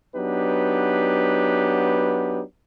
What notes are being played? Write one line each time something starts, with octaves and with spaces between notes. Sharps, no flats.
F#3 B3 D4 D#4 G4 B4